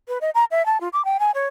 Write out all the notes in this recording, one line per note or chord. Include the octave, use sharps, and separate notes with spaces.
B4
D#5
A#5
E5
A5
F4
D6
G5
G#5
C#5